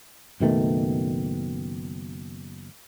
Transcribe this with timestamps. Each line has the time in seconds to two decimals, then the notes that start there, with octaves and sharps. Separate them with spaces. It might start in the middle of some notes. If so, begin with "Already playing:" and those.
0.40 F#1 B2 D#3 A3